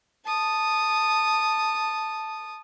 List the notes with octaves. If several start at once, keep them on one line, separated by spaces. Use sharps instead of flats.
A5 D#6